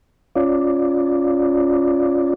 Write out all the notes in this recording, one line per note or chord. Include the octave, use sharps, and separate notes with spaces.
C#4 F4 D5